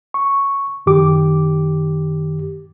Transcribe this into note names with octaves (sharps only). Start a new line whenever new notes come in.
C#6
F#2 D#3 G4 D6